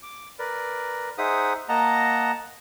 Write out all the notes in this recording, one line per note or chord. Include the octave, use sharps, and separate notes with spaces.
D6
A#4 B4 D5
D#4 G#4 C5 E5 F#5 D#6
A#3 D#5 F#5 A5 A#5